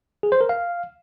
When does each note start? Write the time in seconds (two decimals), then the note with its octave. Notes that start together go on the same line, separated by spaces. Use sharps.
0.23 G#4
0.32 C5
0.41 A#4
0.49 F5